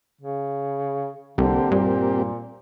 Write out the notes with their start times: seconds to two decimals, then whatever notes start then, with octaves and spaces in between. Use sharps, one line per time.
0.21 C#3
1.38 C2 D3 A#3 C4 G4
1.71 G2 A#2